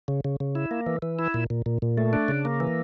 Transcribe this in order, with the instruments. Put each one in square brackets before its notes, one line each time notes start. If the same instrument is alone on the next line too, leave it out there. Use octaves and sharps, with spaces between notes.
[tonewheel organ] C#3
C#3
C#3
E4
A#3
E3
E3
E4
A#2
A#2
A#2
A#2
A3
D4
C#3
A#3
E3